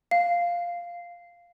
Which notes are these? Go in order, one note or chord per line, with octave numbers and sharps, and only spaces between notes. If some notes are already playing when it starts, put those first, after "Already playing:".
F5